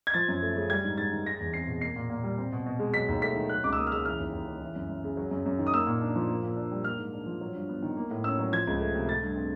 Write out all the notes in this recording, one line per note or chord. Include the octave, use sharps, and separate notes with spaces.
G#6
F3 A6
F#2
A3
C#3
G3 G#6
G#2
G#2 A6
D#3
G#3 A#6
E2
C4 C7
B2
A#3 C7
A#2
A#2
G3
C4
B2
B2
G#3
F#3 B6
D#2
A3 B6
D#3
F#3 F#6
C#2 D6
E6
A#3 D#6
F6
C#3 E6
E3 F6
D#2
D#2
C#3
E3
F#2
F#2
C#3
F#3
F#2
F#2
D#3
D#6
A#3 E6
A#2
D4
F3
A#3
A#2
D4
G3
A#3 F6
G#2
D4
F3
F#3
G2
B3
D#3
A#3
A2
C#4 E6
F#3
F3 G#6
C#2
A3
C3
A3 A6
G2
C4